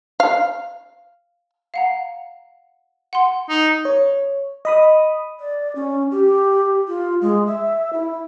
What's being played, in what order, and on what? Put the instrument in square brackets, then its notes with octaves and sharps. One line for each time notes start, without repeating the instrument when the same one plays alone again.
[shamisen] F5
[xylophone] F5 F#5 A#5
F#5 C6
[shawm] D#4
[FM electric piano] C#5
D#5 B5 D#6
[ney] D5
C#4
G4
F4
G#3
E5
E4